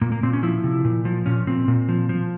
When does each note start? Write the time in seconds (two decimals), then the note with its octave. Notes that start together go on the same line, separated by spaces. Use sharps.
0.01 A#2 A#3
0.12 A#3
0.23 A#2 C4
0.33 C#4
0.43 F3 E4
0.64 C3
0.84 A#2
1.05 F3
1.26 A#2 C#4
1.47 A#2 C4
1.68 A#2
1.88 F3
2.09 F3